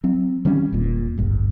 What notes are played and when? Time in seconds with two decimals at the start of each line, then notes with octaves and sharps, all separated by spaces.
0.04 F#3 C4
0.45 D#3 G3 C4 C#4
0.73 E1 A#2
1.18 D1 G#1 G2